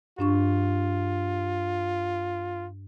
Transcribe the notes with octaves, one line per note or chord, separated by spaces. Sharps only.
G2 D4 F4 C#6